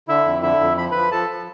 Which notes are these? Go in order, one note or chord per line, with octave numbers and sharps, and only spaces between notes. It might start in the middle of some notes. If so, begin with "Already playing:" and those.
D3 E4 E5
F2
D3 E4 E5
F2
F3 B5
F3 B4 B5
F3 A4 A5
F3